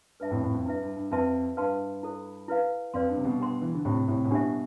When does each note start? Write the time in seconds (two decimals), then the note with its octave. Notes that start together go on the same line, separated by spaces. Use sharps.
0.20 G2 B4 E5 A5
0.31 F2 A2
0.43 F2 A2
0.55 F2
0.66 G2 E4 B4 E5
0.81 G2
0.96 G2
1.11 F2 E4 B4 E5 A5 C6
1.57 G2 B4 F5 A5 C6
2.03 E4 A4 C5
2.48 E4 B4 F5
2.94 F2 B4 D5 F5 C6
3.09 G2
3.17 C3
3.25 G2 B2
3.40 G4 C5 G5 C6
3.61 E3
3.74 D3
3.85 A2 C3 E4 G4 C5
4.08 A2 C3
4.24 A2
4.31 G2 B2 D4 G4 C5 E5